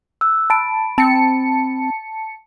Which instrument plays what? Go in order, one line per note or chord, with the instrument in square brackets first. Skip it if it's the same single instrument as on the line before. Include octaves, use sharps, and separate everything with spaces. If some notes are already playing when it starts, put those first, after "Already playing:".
[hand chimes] E6 F#6
[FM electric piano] A5 [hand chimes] B5 D7
[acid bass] C4 [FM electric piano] A5 C#7